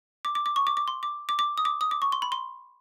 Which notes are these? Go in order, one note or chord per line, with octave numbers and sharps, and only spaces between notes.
D6
D6
D6
C#6
D6
D6
C6
D6
D6
D6
D#6
D6
D#6
D6
C#6
C6
B5
C6